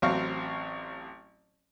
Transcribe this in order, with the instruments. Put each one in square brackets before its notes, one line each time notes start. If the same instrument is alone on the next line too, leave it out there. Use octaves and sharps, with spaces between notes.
[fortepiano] A1 F#3 C4 F5 C#6